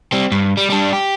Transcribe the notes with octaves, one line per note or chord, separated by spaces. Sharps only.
G3 C4
G2
G3
G3 D4
G4